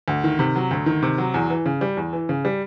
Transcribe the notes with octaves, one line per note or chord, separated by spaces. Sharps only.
D2
D#3
C3
F#3
D2
D#3
C3
F#3
E2
E3
C#3
G3
E2
E3
C#3
G3